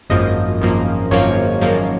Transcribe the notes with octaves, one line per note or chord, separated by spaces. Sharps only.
G#1 F#2 F3 A#3 D#5
G#1 F#2 F3 A#3
G#1 F#2 F3 A#3 C#5
G#1 F#2 F3 A#3